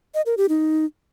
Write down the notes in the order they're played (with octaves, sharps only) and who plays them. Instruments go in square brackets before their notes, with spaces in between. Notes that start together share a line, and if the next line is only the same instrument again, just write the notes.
[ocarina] D#5
A#4
G4
D#4